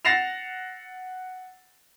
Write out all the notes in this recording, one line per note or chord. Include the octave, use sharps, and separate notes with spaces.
F#5 A6 A#6 C7 E7 F7